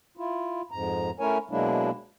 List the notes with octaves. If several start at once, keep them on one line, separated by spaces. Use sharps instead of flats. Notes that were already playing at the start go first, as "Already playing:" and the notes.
E4 F4
F2 G#2 A#5
A3 C#4 E4 A#4 C#5 G#5
B2 F#3 G#3 A#3 D4 E4